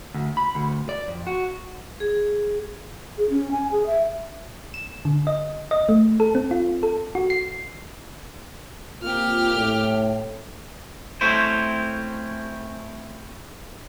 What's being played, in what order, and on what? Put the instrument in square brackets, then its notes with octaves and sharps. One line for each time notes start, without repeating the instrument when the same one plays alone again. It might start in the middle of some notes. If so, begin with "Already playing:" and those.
[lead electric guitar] D2
B5
D2
D5
F2
F#4
[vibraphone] G#4
[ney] G#4
C#4
G#5
G#4
E5
[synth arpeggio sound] E7
D3
D#5
D#5
A3
A4
C4
F4
A4
F#4
C7
[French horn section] A#3 C4 F4 [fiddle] G4 F6
[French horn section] A2
[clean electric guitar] A3 C4 C#4 E4 C5